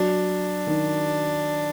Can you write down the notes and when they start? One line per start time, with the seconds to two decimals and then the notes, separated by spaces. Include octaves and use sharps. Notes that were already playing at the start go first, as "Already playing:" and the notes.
Already playing: F#3 D4
0.67 D#3